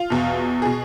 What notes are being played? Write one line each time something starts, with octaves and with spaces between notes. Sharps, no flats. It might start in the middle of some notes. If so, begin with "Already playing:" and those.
Already playing: F4
E2 B2
B2 G#4